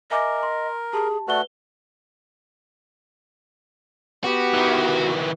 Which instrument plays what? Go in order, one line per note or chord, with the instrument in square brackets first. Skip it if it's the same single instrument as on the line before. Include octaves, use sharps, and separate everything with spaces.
[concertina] A#4 [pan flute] D#5 [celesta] E5 G#5 D6
[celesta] C6
[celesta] G4 A5 [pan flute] G#4
[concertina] A3 F#4 [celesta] B4 G7 [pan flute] D5
[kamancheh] B3 G4 [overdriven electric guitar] F#4
[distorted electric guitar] D#3 E3